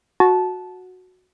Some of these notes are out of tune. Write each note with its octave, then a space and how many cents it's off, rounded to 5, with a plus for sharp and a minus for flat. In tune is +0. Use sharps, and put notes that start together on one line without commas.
F#4 -10 A5 -15